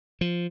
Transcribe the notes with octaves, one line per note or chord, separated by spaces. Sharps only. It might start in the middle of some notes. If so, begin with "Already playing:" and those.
F3